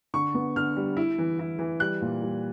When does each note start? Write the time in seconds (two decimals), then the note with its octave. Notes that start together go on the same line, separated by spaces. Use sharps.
0.14 D3 C#6
0.34 B3
0.56 D3 F6
0.77 G3
0.97 E4
1.18 E3
1.39 E4
1.59 E3
1.80 G3 F#6
2.01 A#2
2.22 G3